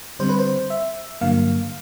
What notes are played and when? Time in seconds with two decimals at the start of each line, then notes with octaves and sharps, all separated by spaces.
0.19 D3 G3 C4 C5
0.29 B4
0.39 C5
0.70 E5
1.21 G2 D3 F#3 A#3 F5